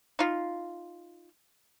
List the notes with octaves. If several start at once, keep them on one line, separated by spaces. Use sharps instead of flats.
D#4 F4